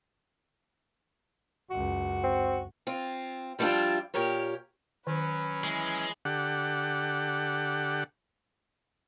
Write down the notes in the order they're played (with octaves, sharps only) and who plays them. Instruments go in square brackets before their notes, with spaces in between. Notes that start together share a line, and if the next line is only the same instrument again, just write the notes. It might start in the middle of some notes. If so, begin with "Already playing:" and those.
[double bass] C#2 F#2 [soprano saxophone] F#4
[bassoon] C4
[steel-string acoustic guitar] C4 F4
F3 G3 B3 D4 E4 F4
A#2 G4 A#4 C#5
[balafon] D#3 [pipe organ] F#3 C#4 [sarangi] B4
[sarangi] E3 [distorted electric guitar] G#3
[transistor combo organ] D3 G4 F#5